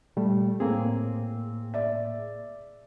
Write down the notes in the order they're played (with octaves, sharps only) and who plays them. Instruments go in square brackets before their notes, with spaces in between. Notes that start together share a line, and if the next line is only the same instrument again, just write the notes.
[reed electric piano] A#2 G3 A3
[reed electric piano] A2 A#3 G#4 [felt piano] C4
[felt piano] D5 E5